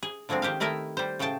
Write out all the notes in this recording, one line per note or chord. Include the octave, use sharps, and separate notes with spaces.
G#4
D3 F3 F#3 G#3 C4
D#3 G4 C5 F5
D#3 A3 E4 A#4 D#5 E5
G3 C5
A2 C#3 C5 G5 A5